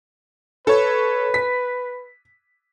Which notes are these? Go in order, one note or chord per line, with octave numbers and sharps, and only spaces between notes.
A4 B4 C#5
B6